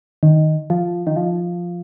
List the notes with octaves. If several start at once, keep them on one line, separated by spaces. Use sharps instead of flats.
D#3
F3
D#3
F3